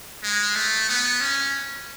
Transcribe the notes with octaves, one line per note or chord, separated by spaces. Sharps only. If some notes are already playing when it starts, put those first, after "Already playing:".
G#3
A3
B3
C#4